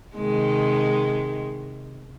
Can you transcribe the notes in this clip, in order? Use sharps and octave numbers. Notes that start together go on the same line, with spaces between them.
C3 D#3 G#3